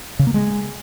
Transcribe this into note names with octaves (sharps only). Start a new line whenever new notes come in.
C#3
A#3
G#3